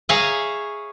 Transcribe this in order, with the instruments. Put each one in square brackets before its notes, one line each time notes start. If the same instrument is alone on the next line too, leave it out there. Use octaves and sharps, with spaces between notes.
[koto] G#4 C#5 E5 F5 G#5 A#5